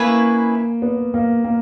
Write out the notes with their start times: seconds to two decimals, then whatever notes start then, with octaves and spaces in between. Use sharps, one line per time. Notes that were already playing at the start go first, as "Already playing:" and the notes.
Already playing: A#3 C#4 E4 G#4 B4
0.82 B3
1.14 A#3
1.44 A#3